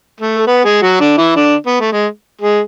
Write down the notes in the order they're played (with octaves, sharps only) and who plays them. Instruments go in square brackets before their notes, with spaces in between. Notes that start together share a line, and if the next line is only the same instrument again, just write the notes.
[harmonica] A3 A4
A4
B3 B4
G#3 G#4
F#3 F#4
D3 D4
E3 E4
D3 D4
B3
A3
G#3
G#3 G#4